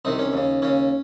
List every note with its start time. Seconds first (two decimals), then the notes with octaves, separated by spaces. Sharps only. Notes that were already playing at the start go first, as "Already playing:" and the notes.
0.05 C2 C3 D#3 D#4
0.19 C#4
0.33 D#2 C#3
0.62 D#2 C#3 C#4